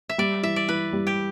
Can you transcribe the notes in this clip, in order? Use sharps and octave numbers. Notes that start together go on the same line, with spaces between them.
E5
G3 D5
E3 E5
D5
E3 B4
G3
G4